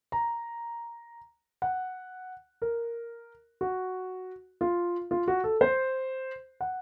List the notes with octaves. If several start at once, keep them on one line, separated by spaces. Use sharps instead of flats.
A#5
F#5
A#4
F#4
F4
F4
F#4
A4
C5
F#5